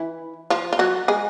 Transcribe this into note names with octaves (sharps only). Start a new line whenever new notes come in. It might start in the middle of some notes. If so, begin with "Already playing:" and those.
Already playing: E3 E4
F3 F4
F4
F#3 F#4
G#3 G#4